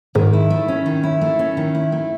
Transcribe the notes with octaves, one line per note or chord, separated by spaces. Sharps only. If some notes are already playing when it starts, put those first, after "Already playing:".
G#2 D#3
E4
A3
C#4
D#3
E4
A3
C#4
D#3
E4
A3